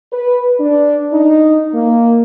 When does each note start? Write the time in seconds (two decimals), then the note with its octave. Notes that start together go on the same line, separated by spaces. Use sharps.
0.12 B4
0.60 D4
1.12 D#4
1.74 A#3